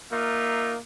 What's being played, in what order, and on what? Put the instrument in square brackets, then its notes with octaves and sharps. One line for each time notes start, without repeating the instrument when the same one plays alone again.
[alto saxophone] A#3 [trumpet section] D#4 F4 E5